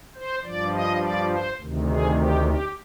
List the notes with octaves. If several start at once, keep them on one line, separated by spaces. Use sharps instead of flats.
C5
G2 F3 D5
D#5
D5
C5
D2 C3 D#3
G#4
G4
G4